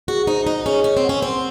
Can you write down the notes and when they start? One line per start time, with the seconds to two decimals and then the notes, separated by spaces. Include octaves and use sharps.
0.08 F#4 G#4
0.27 D#4 C5
0.46 D#4 D#5
0.66 C#4 G#4
0.84 C#4 C#5
0.97 C4
1.04 F#5
1.09 C#4
1.22 C4 C6